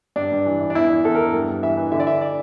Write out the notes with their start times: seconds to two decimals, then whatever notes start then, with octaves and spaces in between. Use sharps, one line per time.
0.16 G2 D4
0.32 G2
0.46 E3
0.61 E3
0.70 D4
0.75 E2 E4
0.90 E3
1.05 E2 A4
1.15 A#4
1.19 E3
1.34 G2
1.48 G2
1.63 E3 E5
1.77 E3
1.92 D3 E5
2.00 D5
2.07 D3 E5
2.21 D5